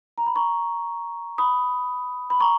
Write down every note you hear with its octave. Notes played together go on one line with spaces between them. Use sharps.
A#5
B5
A#5 C#6
B5 D#6
B5
A#5 C#6